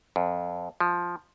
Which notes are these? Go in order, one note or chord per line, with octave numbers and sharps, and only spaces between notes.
F2
F3